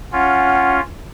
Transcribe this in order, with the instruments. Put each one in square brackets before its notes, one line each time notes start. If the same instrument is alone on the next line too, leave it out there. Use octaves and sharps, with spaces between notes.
[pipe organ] C#4 F4 [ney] F#5